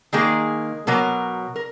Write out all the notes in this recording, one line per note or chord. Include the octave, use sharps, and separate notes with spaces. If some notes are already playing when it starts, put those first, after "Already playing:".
D#3 G#3 A#3 G#4
B2 F#3 A#3 A#4
A#4